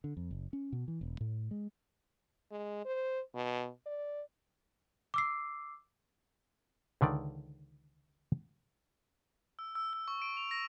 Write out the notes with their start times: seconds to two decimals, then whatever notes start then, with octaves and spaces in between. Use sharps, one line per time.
0.04 D3
0.17 F2
0.31 F#1
0.53 C#4
0.72 B2
0.88 E3
1.01 E1
1.21 A2
1.51 G#3
2.52 G#3
2.85 C5
3.35 B2
3.86 D5
5.14 D6 E6 C7
7.01 C#2 D3 D#3 D5
9.59 E6
9.75 E6
9.93 E6
10.08 C#6
10.22 D7
10.37 F7
10.51 A#6